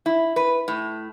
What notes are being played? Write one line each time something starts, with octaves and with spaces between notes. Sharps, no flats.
E4
B4
A2